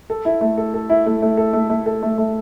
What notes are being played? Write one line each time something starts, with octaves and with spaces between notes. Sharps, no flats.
A4
E4
A3
A4
A4
E4
A3
A3
A4
A3
A3
A4
A3
A3